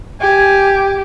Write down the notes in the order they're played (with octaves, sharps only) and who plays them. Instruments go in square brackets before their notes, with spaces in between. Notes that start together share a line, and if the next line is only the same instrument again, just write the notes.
[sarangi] G4 [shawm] G#5